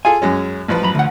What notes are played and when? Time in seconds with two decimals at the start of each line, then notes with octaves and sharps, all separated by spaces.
0.05 F4 G#4 A4 G#5
0.22 F#2 G#3 C#4
0.68 A1 F3 B4
0.82 F#2 A#5 B5
0.95 D2 F#5